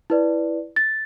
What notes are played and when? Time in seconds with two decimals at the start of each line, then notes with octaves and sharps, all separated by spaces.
0.10 E4 B4 D5
0.76 A6